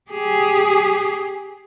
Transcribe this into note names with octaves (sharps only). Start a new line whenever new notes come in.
G4 G#4